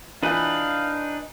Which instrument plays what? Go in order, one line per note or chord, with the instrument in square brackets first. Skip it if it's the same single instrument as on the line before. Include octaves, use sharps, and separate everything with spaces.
[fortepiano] E3 F4 [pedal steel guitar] D4 D#4 B4 [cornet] F5